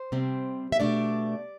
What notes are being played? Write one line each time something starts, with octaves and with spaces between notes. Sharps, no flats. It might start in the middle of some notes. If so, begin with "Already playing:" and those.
Already playing: C5
C3 G3 C4
E5
B2 A3 D4 D5